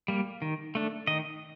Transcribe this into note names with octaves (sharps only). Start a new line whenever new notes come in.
G3 A#3
D#3
A3 D4
D#3 D#5